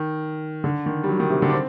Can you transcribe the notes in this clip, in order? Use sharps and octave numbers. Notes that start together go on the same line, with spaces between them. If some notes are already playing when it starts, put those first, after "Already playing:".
Already playing: D#3
D3
D#3
G3
F#3
D#3
C3
D3
D4
C4